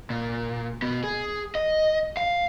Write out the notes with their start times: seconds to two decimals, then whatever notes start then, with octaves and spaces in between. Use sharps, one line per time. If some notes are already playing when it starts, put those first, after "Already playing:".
0.10 A#2
0.82 B2 B3
1.04 G#4
1.55 D#5
2.17 F5